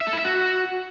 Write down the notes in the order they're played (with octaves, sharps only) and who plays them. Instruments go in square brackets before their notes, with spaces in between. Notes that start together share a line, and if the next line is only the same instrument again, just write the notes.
[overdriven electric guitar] E5
A4
E4
E5
F#4